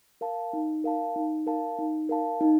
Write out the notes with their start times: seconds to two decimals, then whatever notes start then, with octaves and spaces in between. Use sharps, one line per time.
0.21 A#4 F5 A5
0.53 D#4
0.84 A#4 F5 A5
1.16 D#4
1.46 A#4 F5 A5
1.79 D#4
2.09 A#4 F5 A5
2.41 D#4